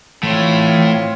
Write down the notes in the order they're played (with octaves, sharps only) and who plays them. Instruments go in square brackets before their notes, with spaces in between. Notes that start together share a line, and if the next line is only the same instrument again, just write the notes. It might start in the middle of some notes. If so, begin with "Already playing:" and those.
[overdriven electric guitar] A2 [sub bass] E3 [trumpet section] C4 F4 C#5